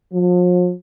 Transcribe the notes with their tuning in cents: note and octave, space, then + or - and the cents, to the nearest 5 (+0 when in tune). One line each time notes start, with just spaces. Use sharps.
F3 +40